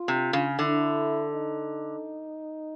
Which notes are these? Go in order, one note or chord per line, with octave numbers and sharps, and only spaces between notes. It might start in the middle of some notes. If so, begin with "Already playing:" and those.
Already playing: F4
C3
C#3
D3 E4
D#4